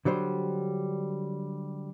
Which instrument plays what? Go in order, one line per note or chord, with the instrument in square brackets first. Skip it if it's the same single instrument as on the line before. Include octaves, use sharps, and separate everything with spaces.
[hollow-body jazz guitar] D3 F#3 G3 C5